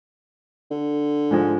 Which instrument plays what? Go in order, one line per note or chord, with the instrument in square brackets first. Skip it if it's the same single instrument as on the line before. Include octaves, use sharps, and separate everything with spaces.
[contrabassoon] D3
[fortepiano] G#2 F3 G#3